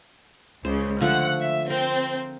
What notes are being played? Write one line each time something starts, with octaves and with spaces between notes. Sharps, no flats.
C#2 C#3 C5
D3 F3 A3 F#5
E5
C4 A#4